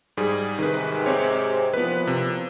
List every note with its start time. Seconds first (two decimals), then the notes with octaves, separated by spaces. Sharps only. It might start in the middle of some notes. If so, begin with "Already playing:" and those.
0.17 G#2 G3 G#4
0.59 G#2 C3 D#3 B4
1.06 C4 G4 C#5
1.73 A#2 E3 F3 B3 B4
2.07 C3